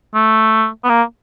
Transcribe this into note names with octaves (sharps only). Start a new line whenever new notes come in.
A3
B3
A#3